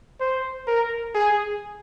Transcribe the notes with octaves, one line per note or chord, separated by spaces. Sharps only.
C5
A#4
G#4